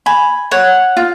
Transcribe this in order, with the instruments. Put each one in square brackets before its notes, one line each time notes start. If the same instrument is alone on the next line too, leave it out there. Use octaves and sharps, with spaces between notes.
[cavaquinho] G#5 [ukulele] B5
[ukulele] C#5 [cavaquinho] F#5
[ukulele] F4